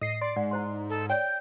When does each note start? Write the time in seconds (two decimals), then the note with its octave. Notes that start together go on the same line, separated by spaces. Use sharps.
0.01 A2 D#5 C7
0.21 D5 C6
0.36 G#2 D5 F#5
0.51 E4 C5 C6
0.90 A4
1.10 C#5 D5 G5 G6